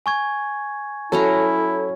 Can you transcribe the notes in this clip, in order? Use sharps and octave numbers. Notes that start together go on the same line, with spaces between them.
G#5 C#6 G#6
F#3 C#4 E4 A4 A#5